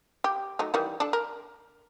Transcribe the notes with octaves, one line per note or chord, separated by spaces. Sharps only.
G4
F#3 A3 D#4
D#3 E3 G3
D4 A4
A#4